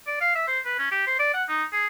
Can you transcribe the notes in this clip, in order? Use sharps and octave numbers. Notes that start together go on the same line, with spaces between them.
D5
F5
E5
C5
B4
C#4
G4
C5
D5
F#5
D#4
G#4